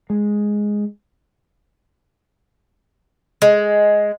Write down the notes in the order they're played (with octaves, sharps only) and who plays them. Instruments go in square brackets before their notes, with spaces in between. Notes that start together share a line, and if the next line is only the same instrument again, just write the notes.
[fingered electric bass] G#3
[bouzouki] G#3